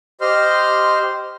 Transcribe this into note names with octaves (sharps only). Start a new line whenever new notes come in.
G4 C5 D#5 C6 F6